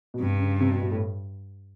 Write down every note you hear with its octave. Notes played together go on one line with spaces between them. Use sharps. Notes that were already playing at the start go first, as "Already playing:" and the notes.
B2
G2 C3
C#3
C3
B2
B2
A2